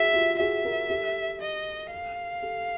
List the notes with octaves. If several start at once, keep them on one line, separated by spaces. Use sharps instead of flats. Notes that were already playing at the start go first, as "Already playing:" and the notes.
Already playing: F#4 G#4 E5
F4 G4
F#4 G#4 E5
G#4 A#4
G4 A4
D#5
F5
G4 A4